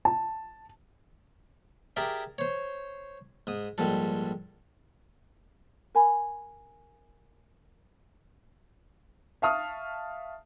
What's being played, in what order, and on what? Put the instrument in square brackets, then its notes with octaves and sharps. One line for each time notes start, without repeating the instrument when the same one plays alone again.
[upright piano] A5
[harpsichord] G4 G#4 A#4 D5 E5
C5 C#5
G#2 D#6
A#1 G#2 G3 A4
[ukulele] A#4 G#5 B5
[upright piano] E5 F5 A5 C#6 D#6 F6